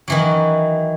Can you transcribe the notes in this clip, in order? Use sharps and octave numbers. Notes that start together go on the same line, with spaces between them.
D#3 E3 F#3